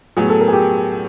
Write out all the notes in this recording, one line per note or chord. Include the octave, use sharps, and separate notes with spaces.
A2 F#3 B3 G#4
A4
A#4
G#4
G4